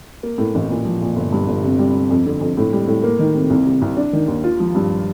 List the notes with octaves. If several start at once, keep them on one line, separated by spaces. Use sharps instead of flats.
A#3
A2
A1
A#2
F3
A#2
G1
G2
G1
C3
G3
C3
F2
D3
F2
A2
G3
A2
A#3
D#3
C3
C2
C3
C2
D4
D#3
D#2
F4
F3
G2